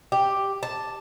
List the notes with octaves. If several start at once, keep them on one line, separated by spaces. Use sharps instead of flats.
G4
A5